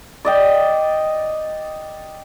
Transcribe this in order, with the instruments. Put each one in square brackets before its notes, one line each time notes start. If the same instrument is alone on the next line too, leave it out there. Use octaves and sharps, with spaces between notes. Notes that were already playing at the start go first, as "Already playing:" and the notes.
[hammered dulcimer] D5 D#5 G5